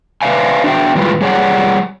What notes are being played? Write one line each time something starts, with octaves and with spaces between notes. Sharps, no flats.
B4 D5 E5 F5 G#5
D4 F#4 E5 G5
A2 E3 G3 G#3 F4 B4
G3 G#4 C#5 D5 F#5